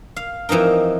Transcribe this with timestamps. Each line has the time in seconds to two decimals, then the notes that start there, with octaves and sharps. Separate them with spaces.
0.16 F5
0.49 E3 F3 C4 D#4 A#4